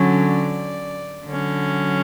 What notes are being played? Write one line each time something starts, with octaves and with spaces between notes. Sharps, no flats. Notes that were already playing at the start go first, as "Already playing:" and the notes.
Already playing: D3 F#3 C#4
D5
D3 F#3 C#4